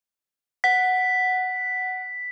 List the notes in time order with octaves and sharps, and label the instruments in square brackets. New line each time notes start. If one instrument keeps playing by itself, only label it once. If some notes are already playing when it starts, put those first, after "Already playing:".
[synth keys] F#5 [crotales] B6